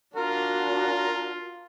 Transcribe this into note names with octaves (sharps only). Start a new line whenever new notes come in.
D4 F4 F#4 A#4